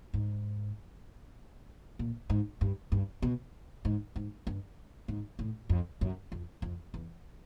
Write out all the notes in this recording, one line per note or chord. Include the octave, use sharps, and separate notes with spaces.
G#2
A#2
G#2
G2
G2
B2
G#2
G#2
G2
G#2
A2
F2
F#2
F2
F2
E2